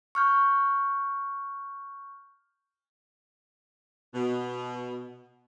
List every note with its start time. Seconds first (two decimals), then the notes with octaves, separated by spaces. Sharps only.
0.15 C#6 F6 G6
4.14 B2